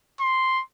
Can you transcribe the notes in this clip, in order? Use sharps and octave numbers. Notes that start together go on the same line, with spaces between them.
C6